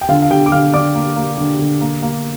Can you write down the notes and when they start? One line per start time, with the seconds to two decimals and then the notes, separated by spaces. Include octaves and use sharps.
0.01 G5
0.09 D3 F4 F5
0.22 F5
0.30 D3 G4 G5
0.46 D6
0.52 D3 F5 F6
0.73 D3 D5 D6
0.95 A#3
1.16 A#3
1.38 D3
1.59 D3
1.81 A#3
2.02 A#3